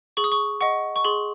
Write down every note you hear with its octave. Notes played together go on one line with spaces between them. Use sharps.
G#4 C#6
D#6
C#6
D#5 F#5 C#6
C#6
G#4 C6